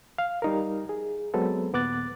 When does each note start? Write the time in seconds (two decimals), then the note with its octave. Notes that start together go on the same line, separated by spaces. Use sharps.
0.18 F5
0.42 G3 D#4 A#4
0.89 G#4
1.34 F#3 G#3 B3 C4 A4 B4
1.73 D#2 A#2 B3 D6 F#6 A6